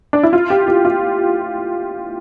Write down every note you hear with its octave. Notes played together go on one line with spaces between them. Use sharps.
D4
E4
F4
G4
G4
F4